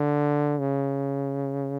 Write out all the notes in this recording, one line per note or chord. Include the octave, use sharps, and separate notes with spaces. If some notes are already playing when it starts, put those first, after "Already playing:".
Already playing: D3
C#3